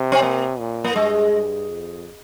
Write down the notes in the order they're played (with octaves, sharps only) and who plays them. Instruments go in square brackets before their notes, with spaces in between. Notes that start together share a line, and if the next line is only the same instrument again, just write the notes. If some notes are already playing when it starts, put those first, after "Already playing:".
Already playing: [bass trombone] C3
[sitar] C4
A#3
[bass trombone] A#2
[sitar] A#3
[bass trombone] G2 [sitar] G#3
[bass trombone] G2
F2